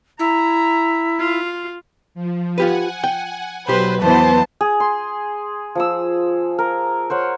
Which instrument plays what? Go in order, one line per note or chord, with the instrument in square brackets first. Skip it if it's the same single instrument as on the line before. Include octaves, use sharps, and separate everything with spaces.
[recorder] E4 [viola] A#5
[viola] F4
[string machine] F3
[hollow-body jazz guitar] F4 G4 B4 [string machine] F#5 G#5
[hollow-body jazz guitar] G5
[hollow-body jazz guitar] B1 G4 [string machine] F#3 [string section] B4 [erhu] C5
[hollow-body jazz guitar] E2 [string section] E3 B3 C5 [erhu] A5
[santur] G#4
C6
F3 D#6 E6
A#4
C5 C#5 F#5